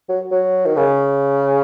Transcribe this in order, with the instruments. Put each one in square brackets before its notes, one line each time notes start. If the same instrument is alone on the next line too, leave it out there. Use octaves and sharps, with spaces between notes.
[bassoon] F#3
F#3
D#3
C#3